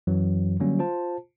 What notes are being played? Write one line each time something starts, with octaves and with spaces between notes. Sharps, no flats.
F#2 E3 F#3
D3 F#3 G3 A#3 C#4
F4 C5 A5